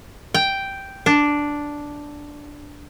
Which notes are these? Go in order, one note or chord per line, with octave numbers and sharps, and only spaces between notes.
G5
D4